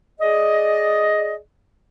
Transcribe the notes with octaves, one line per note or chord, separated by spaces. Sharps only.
G#4 D5 D#5